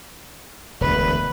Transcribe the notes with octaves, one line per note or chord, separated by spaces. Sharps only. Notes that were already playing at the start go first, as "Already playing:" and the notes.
E1 D2 B4